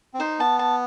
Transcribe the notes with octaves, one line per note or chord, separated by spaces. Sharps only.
C4
D#4 C5
B3 A5
A5